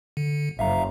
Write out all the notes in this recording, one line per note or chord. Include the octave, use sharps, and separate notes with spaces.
D3
F#1 E5 F5 A#5